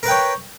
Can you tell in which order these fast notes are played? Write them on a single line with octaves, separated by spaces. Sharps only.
A#4 B4 G5 C#5